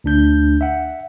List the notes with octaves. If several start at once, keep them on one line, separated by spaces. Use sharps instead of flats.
D2 D4 G6
E5 F#5